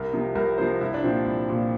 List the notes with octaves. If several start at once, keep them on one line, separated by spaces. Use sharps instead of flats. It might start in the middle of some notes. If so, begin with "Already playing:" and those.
Already playing: C2 A#4
C3 F3
C2 A#4
C3 F3 C5
C2 E4
D4
A#2 F3 C4
C2
A#2 F3